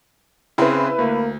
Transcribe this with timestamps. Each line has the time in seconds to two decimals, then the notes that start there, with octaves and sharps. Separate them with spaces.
0.58 C#3 C4 E4 B4
0.98 D2 A#3